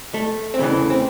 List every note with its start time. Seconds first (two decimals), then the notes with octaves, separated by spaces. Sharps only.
0.14 A3
0.54 C4
0.59 E2 C#3 E3 A3
0.90 C4